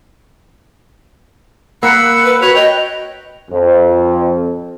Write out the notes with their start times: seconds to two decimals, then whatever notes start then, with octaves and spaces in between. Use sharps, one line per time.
1.83 A#3 F#5 B5 E6 F#6
2.25 B4
2.42 F#4 C#5 B5 F#6 F7
2.55 D#5 G5
3.51 F2